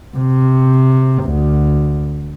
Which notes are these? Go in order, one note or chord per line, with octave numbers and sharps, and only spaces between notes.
C3
D2